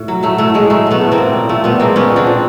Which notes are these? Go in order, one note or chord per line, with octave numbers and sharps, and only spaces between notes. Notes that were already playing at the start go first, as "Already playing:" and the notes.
Already playing: A2
F#3
F#3 A3
A2 A3
A2 G#3
F#3 A3
F#3 A3 B3
A2
A#3 C4
A2
A#2
F3 A3
A#2 A3 B3
G#3 A#3 C4
A#2 B3 C#4
F3 C4 D4
A#2